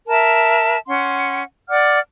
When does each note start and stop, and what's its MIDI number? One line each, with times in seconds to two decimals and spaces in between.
0.08 0.77 70
0.08 0.77 76
0.08 0.77 81
0.87 1.42 61
0.87 1.42 78
0.87 1.42 84
1.69 1.99 74
1.69 1.99 78
1.69 1.99 86
1.69 1.99 89